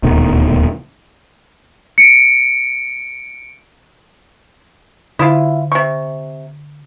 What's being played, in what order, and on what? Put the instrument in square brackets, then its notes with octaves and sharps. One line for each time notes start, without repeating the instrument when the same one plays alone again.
[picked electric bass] D#1 D2 B2 D#3
[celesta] C#7 D7
[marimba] D3 [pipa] E4 F4
[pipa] C3 C#6